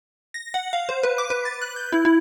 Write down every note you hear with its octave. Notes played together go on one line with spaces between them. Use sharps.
A#6
F#5
F5
C5
B4
D6
B4
A6
F#6
G6
E4
E4